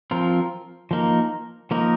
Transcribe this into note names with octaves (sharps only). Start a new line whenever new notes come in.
F3 C4 F4 A#4
F3 A#3 D#4 A#4
F3 A#3 D#4 A#4